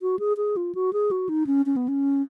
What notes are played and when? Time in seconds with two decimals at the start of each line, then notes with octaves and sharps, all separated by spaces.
0.02 F#4
0.19 G#4
0.37 G#4
0.57 F4
0.75 F#4
0.93 G#4
1.11 F#4
1.29 D#4
1.47 C#4
1.66 C#4
1.76 B3
1.88 C#4